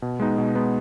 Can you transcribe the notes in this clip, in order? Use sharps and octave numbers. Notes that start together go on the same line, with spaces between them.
B2
G#3 B3 D#4
B2
G#3 B3 D#4